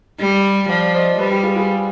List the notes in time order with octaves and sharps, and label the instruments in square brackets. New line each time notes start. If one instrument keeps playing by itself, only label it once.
[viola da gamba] G3
[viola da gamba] F3 [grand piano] D5 F5
[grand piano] C5 D#5
[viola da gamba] G3 [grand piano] B4 D5
[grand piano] G4 B4
F4 G#4
F4 G#4